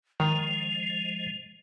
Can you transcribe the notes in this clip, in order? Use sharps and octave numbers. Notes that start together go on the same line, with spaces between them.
D#3 F3 G#3 F7